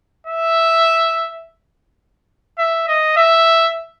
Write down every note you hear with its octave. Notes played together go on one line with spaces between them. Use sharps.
E5
E5
D#5
E5